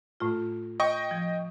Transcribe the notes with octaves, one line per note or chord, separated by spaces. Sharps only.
A2 A3 F4
D#5 G5 C#6
F3